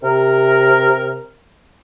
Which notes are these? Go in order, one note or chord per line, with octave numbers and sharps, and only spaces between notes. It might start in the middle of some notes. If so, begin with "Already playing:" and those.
C3 A#4